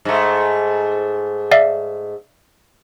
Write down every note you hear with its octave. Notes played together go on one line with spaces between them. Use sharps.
G#2 A3
D5 E5 F5